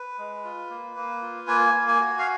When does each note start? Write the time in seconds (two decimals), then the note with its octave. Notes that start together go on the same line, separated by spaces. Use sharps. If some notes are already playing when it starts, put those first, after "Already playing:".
Already playing: B4
0.19 G#3
0.44 F4
0.70 A#3
0.97 A#3
1.22 F4
1.48 A#3 G#5
1.74 A#3
1.88 G#5
2.00 F#4
2.19 F5